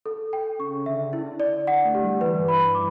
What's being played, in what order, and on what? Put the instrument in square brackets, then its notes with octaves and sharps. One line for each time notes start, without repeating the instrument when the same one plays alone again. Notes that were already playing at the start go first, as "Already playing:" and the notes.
[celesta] A4
G5
[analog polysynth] C#3 [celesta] C#6
[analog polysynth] D3 [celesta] E5
[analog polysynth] D3 [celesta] E4
[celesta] D5
[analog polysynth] D3 [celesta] F#5
[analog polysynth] A3
[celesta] G4
[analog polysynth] G3
[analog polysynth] E3 [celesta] B4
[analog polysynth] G2
[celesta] B5
[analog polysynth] G2
[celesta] D6